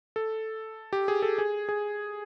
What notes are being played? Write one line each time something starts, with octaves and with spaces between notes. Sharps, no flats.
A4
G4
G#4
A4
G#4
G#4